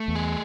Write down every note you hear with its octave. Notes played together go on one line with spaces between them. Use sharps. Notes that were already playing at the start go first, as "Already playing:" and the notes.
Already playing: A3
E2
G#4